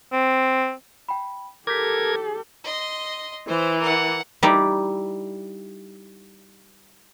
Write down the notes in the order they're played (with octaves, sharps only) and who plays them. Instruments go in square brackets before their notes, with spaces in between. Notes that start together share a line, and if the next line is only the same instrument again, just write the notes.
[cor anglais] C4
[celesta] G5 B5
[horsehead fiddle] G4 A4 [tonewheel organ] A#4 G#6 [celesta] D6 G6 B6
[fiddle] D#5 C6
[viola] E3 [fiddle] C5
[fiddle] A#4 F#5
[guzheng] G3 D#4 E4 D5